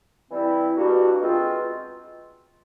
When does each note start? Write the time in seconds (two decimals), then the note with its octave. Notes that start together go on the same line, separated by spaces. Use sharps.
0.31 E3 G3 C4 E4
0.76 B2 G3 A#3 D4 F#4
1.21 B2 G#3 C4 F4